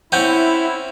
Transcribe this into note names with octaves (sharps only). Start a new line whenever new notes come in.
C4 C#4 E4 F#5 G6